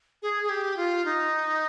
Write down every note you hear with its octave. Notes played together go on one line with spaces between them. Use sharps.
G#4
G#4
G4
F4
D#4